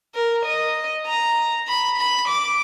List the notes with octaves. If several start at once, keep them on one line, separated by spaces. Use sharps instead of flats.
A#4
D#5
A#5
B5
B5
D6